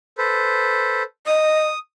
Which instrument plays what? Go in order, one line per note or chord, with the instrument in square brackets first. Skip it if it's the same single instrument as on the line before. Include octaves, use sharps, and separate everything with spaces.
[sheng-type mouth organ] A4 B4 C5
[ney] D#5 [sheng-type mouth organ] D#6